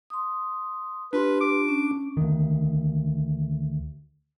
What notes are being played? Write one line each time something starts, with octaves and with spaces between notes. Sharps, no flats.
C6 D#6
D4 F4 G4 B4 C6
D6
C#4
D2 D#3